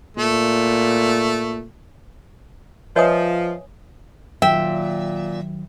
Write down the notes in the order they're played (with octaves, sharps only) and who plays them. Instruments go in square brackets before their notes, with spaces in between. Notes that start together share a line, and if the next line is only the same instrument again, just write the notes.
[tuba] A#2 [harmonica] A3
[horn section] F3 [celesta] B4 D#5 E5 [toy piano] C#5 G#5 D#6
[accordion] A#2 [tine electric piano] D#3 F#3 [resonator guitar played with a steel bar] E5 [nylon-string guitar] G5